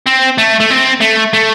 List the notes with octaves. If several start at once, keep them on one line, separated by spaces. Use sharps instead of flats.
C4
A3
A3
C4
A3
A3